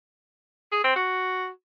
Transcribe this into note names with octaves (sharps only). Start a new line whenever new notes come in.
G#4
C4
F#4